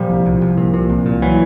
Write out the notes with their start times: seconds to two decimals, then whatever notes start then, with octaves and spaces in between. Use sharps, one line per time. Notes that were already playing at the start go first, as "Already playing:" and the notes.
Already playing: A#2 F3 G3
0.10 C2
0.26 C2
0.41 C2
0.57 A#2
0.74 A#2
0.90 C2
1.06 A#2
1.22 E3 F#3